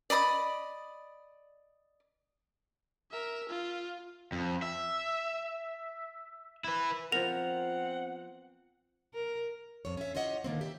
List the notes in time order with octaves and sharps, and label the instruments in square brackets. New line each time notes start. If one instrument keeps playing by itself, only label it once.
[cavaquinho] D5 D#5 B5 D#6
[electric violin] A#4 E5
F4
[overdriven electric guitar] F2
E5
E4 B4
[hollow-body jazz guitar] F3 A#4 [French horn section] B3 C4 [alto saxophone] F#5 [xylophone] F7
[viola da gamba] A#4
[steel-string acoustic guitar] F2 C#5
C#4 E5
F4 G4 C#5 D#5 F#5
D3 D#3 A#3 C4
G4 E5